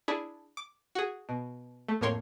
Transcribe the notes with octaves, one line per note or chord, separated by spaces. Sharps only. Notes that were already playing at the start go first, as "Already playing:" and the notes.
D4 E4 G#4
D6
F#4 G#4
B2
A3
F2 A2 A#3 A#4 C#5 C6